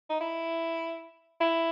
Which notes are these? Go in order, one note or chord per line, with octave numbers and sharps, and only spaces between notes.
D#4
E4
E4